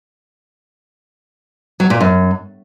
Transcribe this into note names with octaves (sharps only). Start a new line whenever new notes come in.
F#3
A#2
F#2